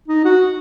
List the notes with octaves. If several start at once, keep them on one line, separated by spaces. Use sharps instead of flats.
D#4
F#4